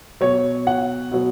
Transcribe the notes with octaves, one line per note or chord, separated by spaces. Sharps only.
B2 F#3 C#5
F#5
B2 F#3